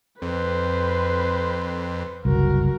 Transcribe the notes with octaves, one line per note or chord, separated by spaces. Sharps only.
F2 B4 C5
F#1 C2 F#4 A#4